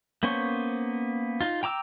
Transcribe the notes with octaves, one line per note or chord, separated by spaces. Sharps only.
A#3 B3 C#4 C5 C#6
D#4 F4
G5 A#5 D6 E6